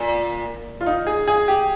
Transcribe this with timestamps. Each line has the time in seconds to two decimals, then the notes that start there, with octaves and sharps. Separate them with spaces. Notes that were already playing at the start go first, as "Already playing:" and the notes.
Already playing: A#2
0.81 F4
0.86 D#4
1.07 G#4
1.28 G#4
1.48 G4